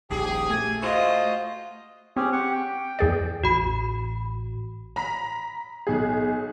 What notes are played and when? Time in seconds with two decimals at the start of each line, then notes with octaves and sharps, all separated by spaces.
0.10 D#1 A#1 G4 G#4
0.50 A3 G#5
0.82 F4 F#4 C5 D#5
2.17 C4 C#4 G4 G#4
2.33 G4 F#5 C#6
2.53 G5
2.99 E2 G#4 D5
3.44 A1 F#4 B5
4.96 A#5 B5 B6
5.87 B1 G#4